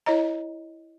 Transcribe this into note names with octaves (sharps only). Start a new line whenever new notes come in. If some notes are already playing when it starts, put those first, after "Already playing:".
E4 C#5 D#5 A#5